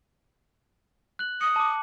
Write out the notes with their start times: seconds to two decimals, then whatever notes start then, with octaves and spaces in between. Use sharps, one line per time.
1.19 F#6 F#7
1.41 D#6 C#7
1.56 A5 D6